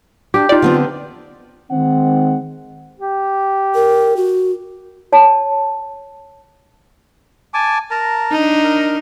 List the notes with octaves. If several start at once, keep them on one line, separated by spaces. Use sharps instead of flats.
D4 G4
D#4 F4 D5
D3 B3 C4
D#3 G#3 C4 F#5
G4
A#4
F#4
C#5 A5
G#5 A5 D6
A#4 A5 A#5
D4 D#4
A#4